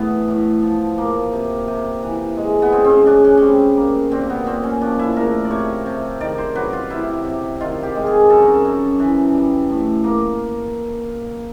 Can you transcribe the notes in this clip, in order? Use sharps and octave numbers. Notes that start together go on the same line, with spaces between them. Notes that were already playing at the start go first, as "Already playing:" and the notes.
Already playing: A2 E3 A3 B3
A2
F3
A#3
C3
C3
E3
G#3
B3
C#3 C4
C4
C#4
C#3 D4
C#4
G3 C4 C#4
A#3
A#2 C4
B3
A#2 C4
C#4
F3 D4
E4
A3 A#4
D5
C3 C#5
C3
D#3 D5
C5
F#3 B4
F4
C3 E4
C3
D#3 F4
G4
G#3
G#4
F#2 A4
A#4
A4
F#2
E3
G3
A2
A#3